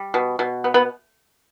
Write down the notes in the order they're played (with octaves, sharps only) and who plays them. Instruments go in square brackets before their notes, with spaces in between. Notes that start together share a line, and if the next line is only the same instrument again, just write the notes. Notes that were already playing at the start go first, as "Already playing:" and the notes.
Already playing: [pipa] G3
B2
B2
B3
B3